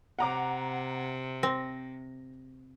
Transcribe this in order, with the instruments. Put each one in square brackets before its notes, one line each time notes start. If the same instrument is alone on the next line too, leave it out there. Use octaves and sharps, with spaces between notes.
[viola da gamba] C3 [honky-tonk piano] F#5 A#5 D6
[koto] C4 [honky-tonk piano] A#6